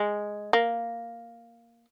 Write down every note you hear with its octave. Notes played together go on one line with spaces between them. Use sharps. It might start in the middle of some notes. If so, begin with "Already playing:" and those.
Already playing: G#3
A#3